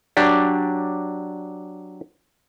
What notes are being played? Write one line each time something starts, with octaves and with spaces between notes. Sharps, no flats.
F#3 D4 G4 D5